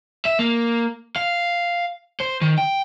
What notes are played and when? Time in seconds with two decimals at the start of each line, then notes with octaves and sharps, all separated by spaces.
0.25 E5
0.39 A#3
1.16 F5
2.20 C5
2.41 D#3
2.58 G5